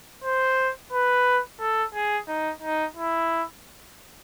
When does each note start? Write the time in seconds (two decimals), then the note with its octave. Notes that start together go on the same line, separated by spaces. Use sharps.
0.24 C5
0.92 B4
1.60 A4
1.94 G#4
2.28 D#4
2.62 D#4
2.96 E4